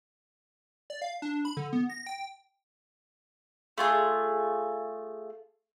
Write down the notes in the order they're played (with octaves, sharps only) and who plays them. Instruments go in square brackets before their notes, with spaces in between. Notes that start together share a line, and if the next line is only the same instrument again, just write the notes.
[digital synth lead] D5
F5
D4
B5
D3
B3
A#6
G5
[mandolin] A3 F4 G#4